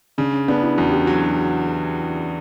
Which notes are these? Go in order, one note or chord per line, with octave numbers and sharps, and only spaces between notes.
C#3 D4
C#4
B3 D4
E4
E2 F#4
G4
F#4
F#3